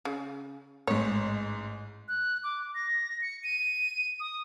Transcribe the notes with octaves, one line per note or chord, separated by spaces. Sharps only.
C#3
A1 G#2 C#5
F#6
D6
A#6
C#7
D#7
D#6